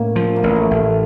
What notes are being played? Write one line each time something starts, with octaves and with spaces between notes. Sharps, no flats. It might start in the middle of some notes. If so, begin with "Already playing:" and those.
Already playing: A2 A#3 C#4
F3
A#3
A1
A3
A1